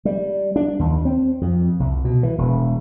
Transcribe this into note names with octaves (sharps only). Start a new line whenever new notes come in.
G3
D4
D#2
C4
F2
C2
B2
E3
E1